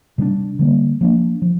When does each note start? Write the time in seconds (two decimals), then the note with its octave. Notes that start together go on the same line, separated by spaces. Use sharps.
0.18 C3 G3 A#3 D4
0.59 D3 G3 A#3
1.01 F3 A#3 D4
1.42 F3